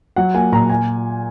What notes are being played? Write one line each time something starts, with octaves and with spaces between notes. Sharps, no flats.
F#3 F#5
A#3 G#5
A#2 A#5
G#5